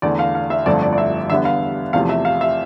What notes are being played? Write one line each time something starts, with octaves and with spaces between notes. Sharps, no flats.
E2 D3 A3 D5
F5
F5
E5
G1 F2 D3 F3 A3 D5
D5
D5
E5
E2 D3 G3 B3 E5
F5
E2 C3 F3 A3 F5
E5
F5
E5